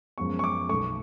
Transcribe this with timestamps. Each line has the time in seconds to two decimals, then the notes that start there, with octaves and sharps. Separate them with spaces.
0.18 F#2 F3 G#3 B3 C#6
0.39 C#6
0.44 D6
0.69 B1 B2 A3 C#6